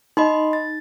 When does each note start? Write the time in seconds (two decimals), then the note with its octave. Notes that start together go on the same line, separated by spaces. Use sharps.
0.17 D#4 D#5 B5 C6
0.53 A6